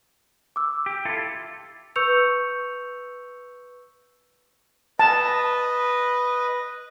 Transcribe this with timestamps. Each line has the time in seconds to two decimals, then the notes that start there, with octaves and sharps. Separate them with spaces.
0.56 D6 E6
0.86 G4
1.05 E4 F4 A4
1.96 B4 C#6 E6 G6 C#7 F7
4.99 B4 D#5 A5